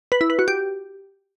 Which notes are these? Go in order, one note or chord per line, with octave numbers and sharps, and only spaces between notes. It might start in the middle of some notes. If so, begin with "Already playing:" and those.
B4
E4
B4
F#4
G4